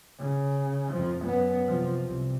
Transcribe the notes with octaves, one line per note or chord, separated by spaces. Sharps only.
C#3
F2 F3
F#2 B3
C3 F3
C2 C3